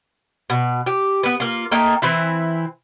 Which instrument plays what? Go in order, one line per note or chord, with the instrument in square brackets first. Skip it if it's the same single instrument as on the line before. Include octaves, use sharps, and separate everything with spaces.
[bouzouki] B2
G4
B3 B4
A#3 F4
A3 A#3 D#4 G5
E3 C4 E4